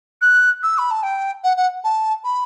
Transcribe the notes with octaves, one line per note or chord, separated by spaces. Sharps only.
F#6
E6
B5
A5
G5
F#5
F#5
A5
B5